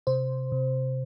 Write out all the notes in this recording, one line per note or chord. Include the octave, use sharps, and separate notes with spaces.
C3 C5
C3